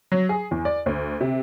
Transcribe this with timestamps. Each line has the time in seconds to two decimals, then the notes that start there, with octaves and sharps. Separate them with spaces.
0.12 F#3
0.29 G#4
0.51 E2
0.65 D5
0.86 D2
1.21 C3